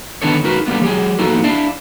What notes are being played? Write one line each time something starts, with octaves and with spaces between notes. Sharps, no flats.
D3 D#3 B3 D4 A4 C#5
D#4 F#4 A#4 B4
D3 G3 A#3 B3
F#3 G4 G#4
A#3 B3 D#4 F#4 A4
D4 E4 D5 F5